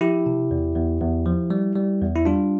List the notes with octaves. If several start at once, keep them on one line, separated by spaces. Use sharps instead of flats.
F3 E4 G4
C3
E2
E2
E2
F3
G3
G3
E2
E4
G3 D4 F4